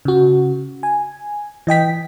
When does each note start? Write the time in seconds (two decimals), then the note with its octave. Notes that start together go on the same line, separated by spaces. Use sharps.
0.05 C#3 F#4
0.83 G#5
1.67 E3 D#5 G5 B6